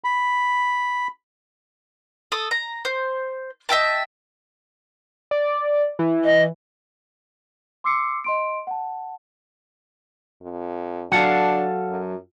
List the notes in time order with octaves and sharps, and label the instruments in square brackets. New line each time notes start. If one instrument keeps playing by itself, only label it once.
[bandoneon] B5
[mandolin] A4 D#6
A#5
C5
D#5 E5 G5 A5
[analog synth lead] D5
E3
[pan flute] D#5
[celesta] C6 D6 E6 C7 C#7
D#5 C6 D7
F#5 A5
[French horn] F2
[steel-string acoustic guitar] F#3 A5 [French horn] D4 [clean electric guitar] A4 F5 F#5
[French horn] F#2